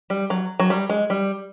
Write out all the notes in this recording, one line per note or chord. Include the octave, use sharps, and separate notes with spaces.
G3
F#3
F#3
G3
G#3
G3